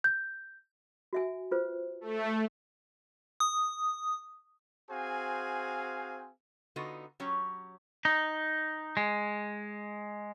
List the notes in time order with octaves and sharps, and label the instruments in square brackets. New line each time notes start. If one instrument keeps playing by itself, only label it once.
[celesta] G6
[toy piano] F#4 E5 G#5
F4 B4 C5
[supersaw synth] A3
[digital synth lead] D#6
[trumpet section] C4 F#4 G#4 C5 F5 G#5
[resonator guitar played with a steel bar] D3 B3 D#4 F4 F#4
F#3 C#4 G4 C#5
[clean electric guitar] D#4
G#3